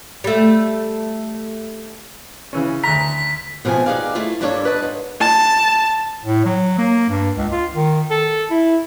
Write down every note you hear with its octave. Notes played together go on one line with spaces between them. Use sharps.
G3 A3
C#3 E3 C#4
D2 A#5 B6
B2 F3 A3 C4 G#5
D#4 G4 G#4 B4 D5 F5
A3 E4 F4
G2 G3 A#3 D4 A4 C#5
B4 D#5 A5
G#2
A5
A2
F#3
A#3
G2
C#2
F4
D#3
A4
E4